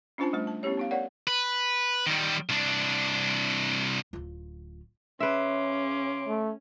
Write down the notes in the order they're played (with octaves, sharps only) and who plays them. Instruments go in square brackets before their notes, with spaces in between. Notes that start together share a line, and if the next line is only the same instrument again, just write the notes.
[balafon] C#4 D4 F4 C5 G#5 A5
G3 A3 C5
A5
B3 C#4 E4 G4 C#5
B3 D#4 F5
A#4 C#5 D5 F#5
[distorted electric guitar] B4
D#3 G3
C2 D4
[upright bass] D1 F4
[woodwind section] C#3 C6 D6 [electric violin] C#4 [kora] B4 E5
[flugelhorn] A3